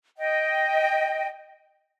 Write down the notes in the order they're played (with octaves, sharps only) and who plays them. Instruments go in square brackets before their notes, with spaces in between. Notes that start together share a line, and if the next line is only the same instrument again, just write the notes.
[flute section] D#5 G5